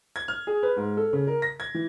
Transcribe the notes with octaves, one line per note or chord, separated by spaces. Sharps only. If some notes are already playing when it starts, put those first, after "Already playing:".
G#6
F6
G#4
B4
G#2
A4
C#3
A#4
A#6
G#6
E3